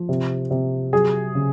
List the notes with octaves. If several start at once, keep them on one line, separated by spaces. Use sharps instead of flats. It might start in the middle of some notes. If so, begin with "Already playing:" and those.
Already playing: F3
C3
C3
F#3 G#4
C#3